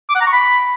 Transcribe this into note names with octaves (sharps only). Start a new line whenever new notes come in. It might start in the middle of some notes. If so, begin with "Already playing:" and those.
D6
F#5
A#5
C#6
B5